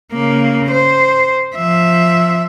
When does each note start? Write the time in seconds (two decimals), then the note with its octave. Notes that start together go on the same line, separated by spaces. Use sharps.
0.13 C#3 A#3
0.71 C5
1.56 F3 E5